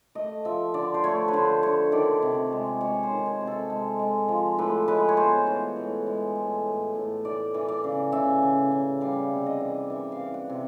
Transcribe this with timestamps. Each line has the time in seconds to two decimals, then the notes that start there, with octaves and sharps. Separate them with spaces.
0.15 A3 D#5
0.45 F3 E5
0.74 D3 D5
0.94 C5
1.04 A3 C#5
1.28 B4
1.33 D3 C5
1.63 D3 C#5
1.92 D#3 D5
2.22 C3
2.52 G#3
2.81 G#3 C#5
3.03 C5
3.10 D#3
3.26 G#4
3.41 C3
3.47 A4
3.70 G#3
3.99 G#3
4.29 F3
4.58 A2 B4
4.88 G#3 B4
5.09 C#5
5.17 B3 C5
5.46 E3 C#5
5.76 A2
6.07 G#3
6.36 A2
6.66 A2
6.95 A2
7.25 E3 D5
7.54 E3
7.69 D5
7.84 C#3
8.12 C#3 E5
8.43 C#3
8.71 C#3
9.01 G3 F5
9.31 C3
9.46 D#5
9.61 E3
9.90 E3 E5
10.12 F5
10.19 E3
10.34 F#5
10.50 C3